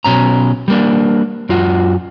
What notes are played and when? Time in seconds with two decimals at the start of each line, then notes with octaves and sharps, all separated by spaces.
0.04 B1 B2 C#4 A#5
0.68 G3 A#3 D4
1.49 F#2 F4 F#4 F#5